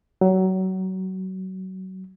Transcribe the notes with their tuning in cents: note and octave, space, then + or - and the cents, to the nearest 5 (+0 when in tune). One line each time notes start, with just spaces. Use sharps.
F#3 +25